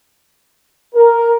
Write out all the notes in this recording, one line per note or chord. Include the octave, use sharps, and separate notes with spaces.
A#4